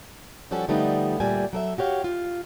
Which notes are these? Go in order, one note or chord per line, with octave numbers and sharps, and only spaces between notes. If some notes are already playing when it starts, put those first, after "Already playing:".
F3 G3 C#4 F#4 A4
D3 F3 G3 A3 B3 D#4
D2 A#2 G3 A3 G#5
F#3 A4 E5
F#4 G4 C#5 F5
F4